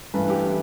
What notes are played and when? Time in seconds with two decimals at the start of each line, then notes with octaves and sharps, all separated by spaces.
0.13 G2 E3 A3 D4 B4
0.30 G4
0.47 E3